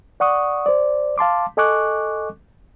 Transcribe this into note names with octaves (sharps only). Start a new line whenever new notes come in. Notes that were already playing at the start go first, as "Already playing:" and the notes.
D5 F#5 C#6 D#6
C5 D5
F5 A5 C6 D6
A4 D#5 G#5 C#6 D6 F#6